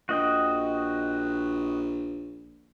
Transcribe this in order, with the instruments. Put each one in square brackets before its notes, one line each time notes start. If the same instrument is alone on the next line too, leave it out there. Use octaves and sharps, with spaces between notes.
[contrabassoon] A#1 [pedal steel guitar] F#4 D#5 G5